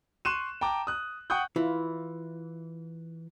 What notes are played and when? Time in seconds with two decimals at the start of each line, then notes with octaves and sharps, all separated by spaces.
0.25 C6 C#6 F#6 D#7 E7
0.61 G5 A5 A#5 D6
0.87 D#6 F#6
1.30 F#5 G5 C#6 D#6 F#6 G6
1.56 E3 E4 F4